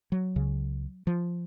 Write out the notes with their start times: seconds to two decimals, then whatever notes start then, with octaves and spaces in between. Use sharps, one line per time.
0.12 F#3
0.36 C#2 C#3
1.07 F3